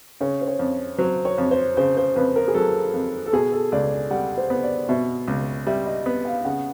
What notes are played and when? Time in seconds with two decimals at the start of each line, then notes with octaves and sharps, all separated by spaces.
0.21 C#3 C#5
0.41 C5
0.47 C#5
0.59 F2
0.98 F#3 C5
1.25 C#5
1.38 F2
1.51 C5
1.77 C#3 C5
1.97 C5
2.15 F2 B4
2.36 A#4
2.48 G#4
2.54 F#3 A4
2.94 F2
3.26 A4
3.33 B2 G#4
3.52 A4
3.72 C#2 D5
4.11 G3 F#5
4.38 C5
4.50 B3
4.63 D5
4.89 B2 E5
5.28 C#2
5.67 G3 E5
5.86 D#5
6.06 B3
6.25 F5
6.44 C#3 F#5